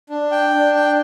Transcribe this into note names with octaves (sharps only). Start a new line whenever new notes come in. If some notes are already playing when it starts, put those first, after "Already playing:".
D4
G5
D4
G5